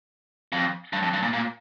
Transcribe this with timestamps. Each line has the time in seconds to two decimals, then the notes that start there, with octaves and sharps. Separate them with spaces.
0.52 F2
0.93 G2
1.03 F2
1.13 G2
1.23 A#2
1.33 A#2